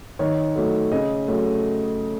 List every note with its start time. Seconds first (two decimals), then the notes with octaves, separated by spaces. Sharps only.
0.19 D#3 C#5
0.56 F#3 A3
0.92 C#3 D#5
1.28 F#3 A3